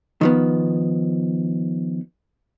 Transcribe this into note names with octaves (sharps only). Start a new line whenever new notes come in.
D#3 F3 B3